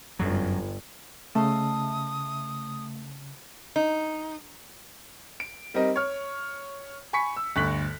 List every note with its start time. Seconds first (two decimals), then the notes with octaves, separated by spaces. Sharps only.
0.19 G1 F#2 F#3
1.35 C#3 A3 A4 D#5 F5 D#6
3.76 D#4
5.40 D7
5.74 G3 C4 D#4 A#4 D#5
5.96 C#5 F6
7.13 G#5 B5 C#6 B6 C#7
7.36 E6
7.56 G1 D2 C#6 F#6 B6 F#7